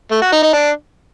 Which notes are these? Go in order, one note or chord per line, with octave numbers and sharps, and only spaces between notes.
A3
F#4
D#4
D#4
D4